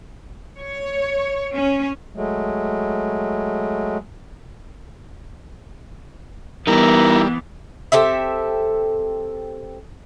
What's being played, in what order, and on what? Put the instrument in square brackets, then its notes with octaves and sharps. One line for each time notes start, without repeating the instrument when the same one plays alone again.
[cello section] C#5
C#4
[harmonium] F#3 G#3 A3
[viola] E3 B3 [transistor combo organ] G3 [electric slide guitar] D#4 E4 [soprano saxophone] A#4
[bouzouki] C4 G4 A4 E5